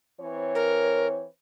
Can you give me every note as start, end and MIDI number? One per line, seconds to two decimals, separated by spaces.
0.20 1.26 52
0.20 1.26 60
0.20 1.26 73
0.55 1.07 70